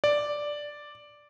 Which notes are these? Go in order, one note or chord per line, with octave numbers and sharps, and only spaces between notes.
D5